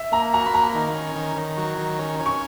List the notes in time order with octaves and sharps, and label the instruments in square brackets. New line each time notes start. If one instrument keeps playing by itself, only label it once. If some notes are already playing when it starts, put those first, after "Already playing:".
Already playing: [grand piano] E5
[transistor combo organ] A#3 [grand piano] A#5
[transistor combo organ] F#4 [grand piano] A#5
[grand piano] B5
[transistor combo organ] A#3 [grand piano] A#5
[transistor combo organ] D#3
C#4
D#3
D#3
F#3
D#3
C#4
C#4
[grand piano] C#6